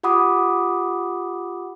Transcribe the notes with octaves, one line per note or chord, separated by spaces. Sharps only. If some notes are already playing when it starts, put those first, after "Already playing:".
F4 G4 F#5 B5 D6 D#6